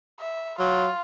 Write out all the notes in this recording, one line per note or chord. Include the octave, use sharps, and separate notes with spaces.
E5
F#3 F4